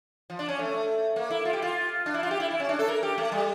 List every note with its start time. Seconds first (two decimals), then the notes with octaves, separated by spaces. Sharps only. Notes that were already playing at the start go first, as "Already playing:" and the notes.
0.30 F3
0.39 D4
0.48 C#4
0.59 A3
1.16 A#3
1.30 E4
1.45 F4
1.53 G4
1.62 F4
2.06 D4
2.14 E4
2.23 F4
2.31 G4
2.40 E4
2.51 E4
2.60 C#4
2.69 D4
2.79 A4
2.88 A#4
3.03 G4
3.18 A3
3.32 G3